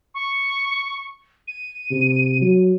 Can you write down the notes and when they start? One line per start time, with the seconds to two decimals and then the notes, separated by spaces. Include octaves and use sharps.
0.14 C#6
1.48 D#7
1.91 C3
2.42 F#3